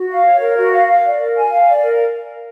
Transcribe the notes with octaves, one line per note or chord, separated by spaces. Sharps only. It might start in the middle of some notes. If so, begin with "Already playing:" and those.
Already playing: F#4
F5
C#5
A#4
F#4
F5
F5
D5
A#4
G#5
F5
D5
A#4